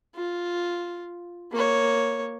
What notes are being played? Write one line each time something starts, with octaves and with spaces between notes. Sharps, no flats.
F4
A#3 C#5